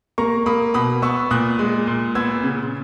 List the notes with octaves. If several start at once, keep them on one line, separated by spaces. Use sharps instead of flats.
A#3 A#5 C#6
A#3 B5 D#6
B2 B5 D#6
B3 C#6 E6
A#2 D#6 F#6
G#3
A#2
B3 E6 G#6
C#3